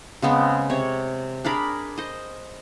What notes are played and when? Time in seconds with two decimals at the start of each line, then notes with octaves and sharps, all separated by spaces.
0.22 C#3 G#3 B3 C4
0.70 C3 C#5
1.45 D4 G#4 A#4 B5
1.98 C5 D#5